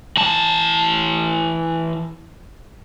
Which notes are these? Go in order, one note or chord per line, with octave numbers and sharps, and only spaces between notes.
E3 A5